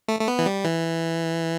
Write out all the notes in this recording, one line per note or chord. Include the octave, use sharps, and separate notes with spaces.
A3
A3
B3
E3
G3
E3